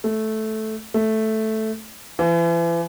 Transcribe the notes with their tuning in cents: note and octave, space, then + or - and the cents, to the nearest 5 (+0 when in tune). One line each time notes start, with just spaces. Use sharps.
A3 -10
A3 -5
E3 +40